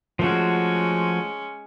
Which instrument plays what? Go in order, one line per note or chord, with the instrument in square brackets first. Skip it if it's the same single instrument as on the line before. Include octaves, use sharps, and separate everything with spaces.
[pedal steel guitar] F3 A3 F#4 [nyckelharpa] G#3 C#4